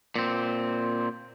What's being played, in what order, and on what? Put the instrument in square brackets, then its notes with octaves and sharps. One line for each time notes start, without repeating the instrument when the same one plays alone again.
[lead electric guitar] A#2 C4